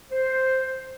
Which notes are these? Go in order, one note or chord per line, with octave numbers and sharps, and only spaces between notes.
C5